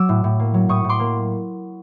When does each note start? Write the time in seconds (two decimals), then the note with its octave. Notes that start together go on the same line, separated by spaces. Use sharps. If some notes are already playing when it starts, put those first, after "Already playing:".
Already playing: F#3 D6 E6
0.09 A2
0.24 A2
0.39 A#3
0.54 F#3
0.69 A2 C#6 D#6
0.84 A2
0.89 C6 D6
0.99 A#3